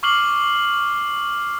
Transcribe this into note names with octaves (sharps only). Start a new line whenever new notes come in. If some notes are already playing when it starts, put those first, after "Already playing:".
C#6 D6 F6 C7 F#7 G7